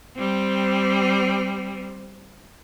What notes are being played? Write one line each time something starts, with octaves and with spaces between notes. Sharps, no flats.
G3 C4